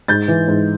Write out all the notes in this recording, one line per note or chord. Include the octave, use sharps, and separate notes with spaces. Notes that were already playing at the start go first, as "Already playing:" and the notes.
G#2 G6 A6
E3
G#2